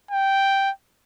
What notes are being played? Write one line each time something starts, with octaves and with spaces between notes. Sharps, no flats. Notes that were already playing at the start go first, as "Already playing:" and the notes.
G5